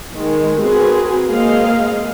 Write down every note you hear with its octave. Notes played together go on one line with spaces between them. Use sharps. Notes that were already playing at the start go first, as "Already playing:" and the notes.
D#3 G#3
C4 F#4 G#4 A#4 B4
G#3 A#3 C4 D#5 F5